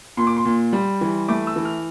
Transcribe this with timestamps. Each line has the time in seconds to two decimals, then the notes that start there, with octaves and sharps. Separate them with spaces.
0.17 A#2 C6
0.27 D6
0.37 C6
0.45 A#2
0.73 G3
1.01 E3
1.28 A3 D6
1.47 E6
1.56 E3
1.65 F6